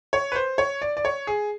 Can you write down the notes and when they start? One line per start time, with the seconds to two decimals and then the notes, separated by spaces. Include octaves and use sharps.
0.13 C#5
0.32 B4
0.35 C5
0.58 C#5
0.82 D5
0.97 D5
1.05 C#5
1.27 G#4